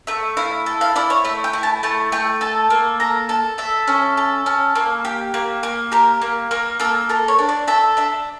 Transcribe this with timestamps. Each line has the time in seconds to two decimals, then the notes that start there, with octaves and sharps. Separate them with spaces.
0.07 A3 E5
0.37 E4 F5
0.66 A4
0.81 F5
0.96 E4 D5
1.10 C#5
1.25 A3 E5
1.44 G5
1.53 E4
1.63 A5
1.83 A3 A5
2.12 A3 G5
2.41 A4 A5
2.70 A#3
3.00 A4 A#5
3.29 A4 A5
3.58 A4 E5
3.88 C#4
4.17 A4
4.46 C#4
4.75 A#3
5.05 G4
5.34 A#3
5.63 A#3
5.92 G4 A#4
6.22 A#3
6.51 A#3 A#4
6.80 A#3 A4
7.09 A4 A#4
7.28 C#5
7.39 D4
7.49 D5
7.68 A4 E5
7.97 D4 E5